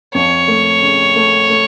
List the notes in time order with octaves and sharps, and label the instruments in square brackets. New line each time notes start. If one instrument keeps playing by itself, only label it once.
[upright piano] F2 [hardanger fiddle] C#5
[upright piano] A3
C#3
A3
A3